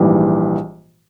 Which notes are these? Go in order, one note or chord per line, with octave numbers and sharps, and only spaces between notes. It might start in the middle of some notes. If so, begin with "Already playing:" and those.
Already playing: A#1 G#2 E3 G3